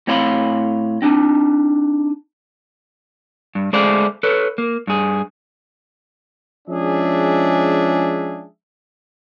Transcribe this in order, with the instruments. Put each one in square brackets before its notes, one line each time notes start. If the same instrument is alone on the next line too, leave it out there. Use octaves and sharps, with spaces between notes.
[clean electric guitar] A2 C4 C#5 F5 B5 C6
C4 D4 D#4
[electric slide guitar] G2
G#3 A3 G#4 C5 D5 F5
A4 B4 C#5
A#3
G2 G#4
[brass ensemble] F3 G#3 C#4 D4 G#4 E5